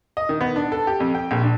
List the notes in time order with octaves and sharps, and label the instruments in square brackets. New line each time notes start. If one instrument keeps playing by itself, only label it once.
[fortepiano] D#5
D#3
B3
D4
A4
G4
F2
G5
A#1
D4